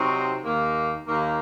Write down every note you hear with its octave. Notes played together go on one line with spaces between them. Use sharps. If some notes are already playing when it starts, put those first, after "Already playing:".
Already playing: C3 F#3 C4 D#4 F#4
D#2 D#3 A#3
D#2 D#3 A#3